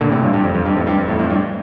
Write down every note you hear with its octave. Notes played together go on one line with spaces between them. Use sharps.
A#2 D3
A2 C3
G2 A#2
G2
F2
F2
G2
F2 A2
G2
F2
F2 A2
F2 A2
G2